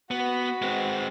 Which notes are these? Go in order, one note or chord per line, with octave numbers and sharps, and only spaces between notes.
B3 F#4 B4
G#3 C4